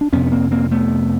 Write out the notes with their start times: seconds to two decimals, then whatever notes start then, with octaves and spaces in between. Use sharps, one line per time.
0.01 D4
0.13 F2 C3 B3 C#4
0.27 C#4
0.32 A#3 C4
0.51 A#3 C4
0.71 A3 B3